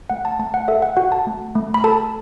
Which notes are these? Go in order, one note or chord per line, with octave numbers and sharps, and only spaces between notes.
A3 F#5
A5
A3 A5
F#5
A4 E5
F#5
F#4 F#5
A5
A3
A3
B5
A4 A5